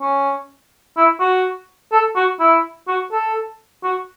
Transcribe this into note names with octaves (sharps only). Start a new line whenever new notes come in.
C#4
E4
F#4
A4
F#4
E4
F#4
A4
F#4